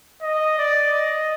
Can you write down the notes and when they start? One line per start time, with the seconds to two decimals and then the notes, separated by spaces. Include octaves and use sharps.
0.22 D#5
0.58 D5
0.93 D#5